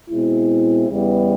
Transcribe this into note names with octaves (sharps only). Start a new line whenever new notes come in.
B2 G#3 C4 E4
E2 C#3 E3 G3 B3